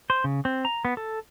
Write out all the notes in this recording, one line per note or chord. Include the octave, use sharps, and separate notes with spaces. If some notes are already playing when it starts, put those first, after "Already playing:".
C5
C#3
C4
A#5
B3
A4